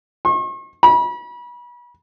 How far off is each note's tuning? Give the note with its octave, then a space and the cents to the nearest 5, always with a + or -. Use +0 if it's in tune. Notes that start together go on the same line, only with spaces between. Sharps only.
C#6 -45
B5 -35